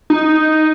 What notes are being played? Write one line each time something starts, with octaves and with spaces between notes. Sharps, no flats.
D#4